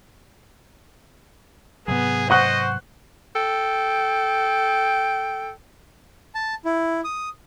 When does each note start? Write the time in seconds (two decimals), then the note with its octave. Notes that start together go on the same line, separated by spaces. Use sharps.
1.88 G#2 C3 F#3 B3 G#4
2.30 C5 D#5 F#5 C#6 F#6
3.36 A4 G5
6.35 A5
6.65 E4
7.04 D#6